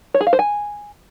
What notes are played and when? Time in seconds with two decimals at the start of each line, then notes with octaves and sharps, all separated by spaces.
0.14 C#5
0.21 G#4
0.27 F5
0.33 C5
0.39 G#5